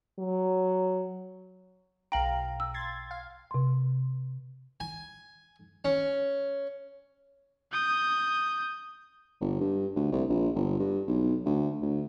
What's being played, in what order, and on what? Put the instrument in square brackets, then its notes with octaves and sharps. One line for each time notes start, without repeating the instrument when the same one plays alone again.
[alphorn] F#3
[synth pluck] B1 F5 A#5 [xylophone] G5 F#7
[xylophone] E6
[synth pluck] C6 G#6 A6
F5
[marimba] C3 C6
[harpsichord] G#5
C#4
[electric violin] D#6 G6
[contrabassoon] G1
G2
D2
C2
A#1
G1
G2
B1
D2
D2